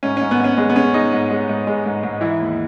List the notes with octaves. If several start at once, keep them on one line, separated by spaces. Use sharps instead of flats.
G#2 C#4
G#2 C#4
B3
G#2 C#4
G#3 B3
B3
G#3 C#4
G#3 D#4
G#2
G#3
G#2
G#3
G#2
G#2
E3 E4
D#2